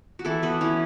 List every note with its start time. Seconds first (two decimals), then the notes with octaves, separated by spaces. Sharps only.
0.19 F#4
0.25 E3 E4 A4
0.43 B3 F#4 B4
0.61 E3 C#4